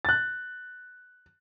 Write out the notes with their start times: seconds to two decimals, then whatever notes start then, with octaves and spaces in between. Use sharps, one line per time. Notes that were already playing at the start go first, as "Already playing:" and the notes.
0.05 F#6 A6